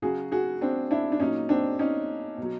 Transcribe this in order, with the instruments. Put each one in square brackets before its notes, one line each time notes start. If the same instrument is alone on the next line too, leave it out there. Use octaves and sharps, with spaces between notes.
[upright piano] C#3 F#3 F#4 G#4
F#4 G#4
C4 D4
D4 E4
D4
A#2 F#3 C#4 D#4
C4 D4
C#4 D#4
B2 F#3